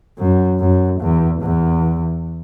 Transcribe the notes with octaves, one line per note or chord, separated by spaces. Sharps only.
F#2
F#2
E2
E2